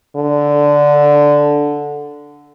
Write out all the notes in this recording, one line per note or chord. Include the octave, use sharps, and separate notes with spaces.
D3